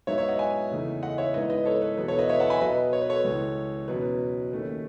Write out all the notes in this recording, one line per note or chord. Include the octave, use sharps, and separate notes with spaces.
G#2 F#3 B3 D#4 C#5 E5
C#5 E5
D#5 F#5
E5 G#5
E2 C#3 E3 A3 D#4
D#5 F#5
C#5 E5
G#2 E3 B3 D#4 B4 D#5
B4 D#5
A4 C#5
B4
E2 B2 F#3 B4
A4 C#5
B4 D#5
C#5 E5
F#5 A5
G#5 B5
E5
B2 F#3 B3 B4 D#5
C#5
B4
A4 C#5
C#2 C#3 E3
E2 B2 F#3 C#4 B4
D#2 D#3 A3 C#4